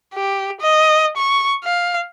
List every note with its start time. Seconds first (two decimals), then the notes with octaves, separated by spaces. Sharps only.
0.15 G4
0.61 D#5
1.17 C#6
1.64 F5